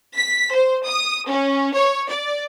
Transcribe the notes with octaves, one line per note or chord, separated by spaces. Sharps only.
B6
C5
D#6
C#4
C#5
D5